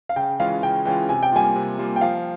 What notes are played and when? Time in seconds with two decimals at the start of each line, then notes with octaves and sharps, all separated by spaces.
0.09 F5
0.16 C#3 G5
0.39 E3 G#3 C#4 F4 F5
0.63 C#3 G5
0.85 E3 G#3 C#4 F4 G5
1.09 C3 G#5
1.23 G5
1.32 G3 A#3 F4 G#5
1.56 C3
1.79 G3 A#3 F4
1.96 G5
2.01 F3 F5